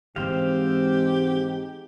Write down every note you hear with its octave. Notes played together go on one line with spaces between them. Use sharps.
G#2 E3 G#3 C4 G4 C5 F5